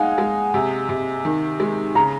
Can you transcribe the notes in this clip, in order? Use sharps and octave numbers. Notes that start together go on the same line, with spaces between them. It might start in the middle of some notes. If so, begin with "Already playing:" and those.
Already playing: G#3 D#4 F5 F#5 G#5
G#3
C3
C3
D#3
G#3
C#3 A#5